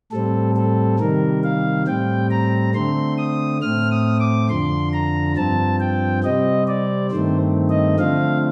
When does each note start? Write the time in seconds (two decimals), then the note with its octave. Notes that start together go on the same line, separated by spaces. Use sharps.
0.12 A2 G3 C4 A4
0.56 A4
0.99 C3 D#3 G3 A#4
1.44 F5
1.87 A2 G3 C4 G5
2.31 A#5
2.74 D3 A3 C4 C6
3.18 D#6
3.62 A2 A3 C4 F6
3.91 D#6
4.20 D6
4.49 F2 D3 F3 C6
4.93 A#5
5.36 G2 F3 C4 A5
5.80 G5
6.24 C3 G3 C4 D#5
6.68 D5
7.11 G2 D#3 A3 C4 C5
7.70 D#5
7.99 D3 F3 A3 C4 F5